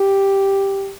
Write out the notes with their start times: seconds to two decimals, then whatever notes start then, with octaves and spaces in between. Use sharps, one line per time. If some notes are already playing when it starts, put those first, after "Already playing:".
Already playing: G4